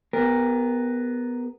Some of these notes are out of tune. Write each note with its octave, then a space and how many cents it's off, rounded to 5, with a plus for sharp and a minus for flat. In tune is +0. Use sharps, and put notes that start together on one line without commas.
B3 +5 G4 +45 A#4 +0